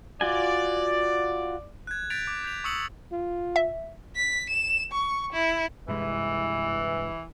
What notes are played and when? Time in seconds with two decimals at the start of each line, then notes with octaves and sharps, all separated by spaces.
0.21 F4 F#4 D5 G#5
1.87 F#6 G#6
2.10 G6 A6 B6 D7 F7
2.27 D6
2.44 G6 B6 F7
2.64 C#6 D#6 E6 C#7 F7 F#7
3.12 F4
3.56 E5
4.16 B6
4.50 E7
4.92 C#6
5.33 E4
5.88 G2 C3 E3 G#3